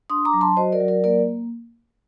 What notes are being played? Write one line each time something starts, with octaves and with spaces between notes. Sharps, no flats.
D4 C6 D#6
A#5 D6
F#3
A5 C6
F#4 C5 D#5
A#4 D5
F#3
A#4 D5
A#3 A#4 D5